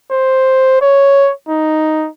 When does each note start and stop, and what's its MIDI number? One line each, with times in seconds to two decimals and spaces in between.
0.12 0.80 72
0.82 1.31 73
1.49 2.08 63